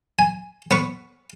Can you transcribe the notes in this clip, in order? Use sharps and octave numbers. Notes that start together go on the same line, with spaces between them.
G#5
B3 B4 C#6